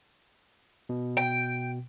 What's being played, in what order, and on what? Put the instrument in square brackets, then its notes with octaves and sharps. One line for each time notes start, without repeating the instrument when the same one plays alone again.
[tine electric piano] B2
[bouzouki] G5